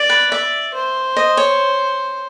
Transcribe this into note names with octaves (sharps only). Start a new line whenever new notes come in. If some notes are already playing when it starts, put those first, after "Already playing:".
Already playing: D5
B4
D5 E5
C5
D#5
C#5